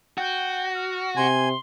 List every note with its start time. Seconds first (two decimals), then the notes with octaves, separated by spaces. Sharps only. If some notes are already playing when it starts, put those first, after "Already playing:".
0.18 F#4 G5
0.74 F6
1.16 C3 G#5 C6